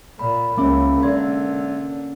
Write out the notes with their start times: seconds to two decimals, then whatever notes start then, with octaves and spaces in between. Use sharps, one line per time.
0.19 A#2 B5
0.58 C#2 G#3 A#3 C#4 E5 B5 D6
1.03 D3 E5 C6 G#6